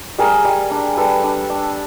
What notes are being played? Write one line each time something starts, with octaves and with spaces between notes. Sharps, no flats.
G3 G#4 A#4
G3
D4
G3 A4 B4
D4
D4